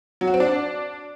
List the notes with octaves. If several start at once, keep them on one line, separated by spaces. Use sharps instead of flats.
F#3
F#4
C4
D4